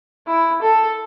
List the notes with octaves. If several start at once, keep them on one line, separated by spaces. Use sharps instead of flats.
E4
A4